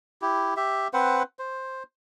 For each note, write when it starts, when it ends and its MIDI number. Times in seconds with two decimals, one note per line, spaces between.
0.22 0.54 64
0.22 0.54 67
0.57 0.88 67
0.57 0.88 76
0.94 1.23 60
0.94 1.23 71
0.94 1.23 72
0.94 1.23 78
1.39 1.83 72